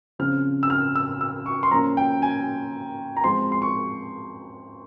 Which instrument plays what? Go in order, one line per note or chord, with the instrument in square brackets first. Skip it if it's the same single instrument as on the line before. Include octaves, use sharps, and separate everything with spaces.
[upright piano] C#3 F3 C4 F6
E6
F6
E6
E6
C#6
C6
F3 A#3 C#4 A#5
G5
G#5
A#5
F3 G#3 C4 C6
C6
C#6